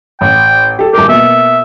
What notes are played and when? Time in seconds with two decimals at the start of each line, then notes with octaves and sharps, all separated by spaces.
0.21 A1 G5
0.79 G4 A4
0.93 D#1 G4 A#4
1.09 B2 A#3 E5